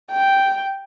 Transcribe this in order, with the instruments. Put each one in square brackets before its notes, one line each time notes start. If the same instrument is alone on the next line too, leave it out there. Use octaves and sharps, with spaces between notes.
[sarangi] G5